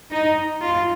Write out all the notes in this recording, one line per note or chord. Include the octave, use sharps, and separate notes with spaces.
D#4
F4